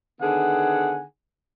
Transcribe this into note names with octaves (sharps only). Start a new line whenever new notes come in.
D3 D#3 B3 G#4 F#5 G#5